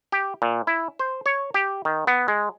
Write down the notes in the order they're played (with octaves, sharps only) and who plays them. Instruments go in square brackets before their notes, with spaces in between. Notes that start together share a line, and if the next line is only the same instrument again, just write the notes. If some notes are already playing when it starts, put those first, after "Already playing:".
[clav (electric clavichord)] G4
A#2
E4
C5
C#5
G4
D#3
B3
G#3